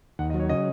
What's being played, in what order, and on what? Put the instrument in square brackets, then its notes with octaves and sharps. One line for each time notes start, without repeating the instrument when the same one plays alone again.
[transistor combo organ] D#2 [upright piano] F#5
[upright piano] D#5
[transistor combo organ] F#3
[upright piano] C#5
[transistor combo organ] C#3 [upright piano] D#5